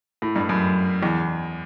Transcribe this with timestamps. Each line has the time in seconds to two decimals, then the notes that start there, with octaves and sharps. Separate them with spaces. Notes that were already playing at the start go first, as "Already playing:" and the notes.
0.22 A2
0.36 G2
0.49 F#2
1.03 E2